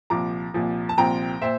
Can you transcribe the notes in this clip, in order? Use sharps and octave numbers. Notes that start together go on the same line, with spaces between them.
C2 A#2 F3 A#5 D6
C2 A#2 F3
A5
C2 A#2 F3 C4 G5 A#5
A#2 C5 E5